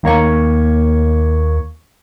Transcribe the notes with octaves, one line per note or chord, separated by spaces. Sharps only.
D#2 A#3 C#5 C#6